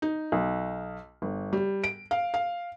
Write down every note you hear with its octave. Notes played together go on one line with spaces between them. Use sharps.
D#4
B1
G1
G3
D7
F5
F5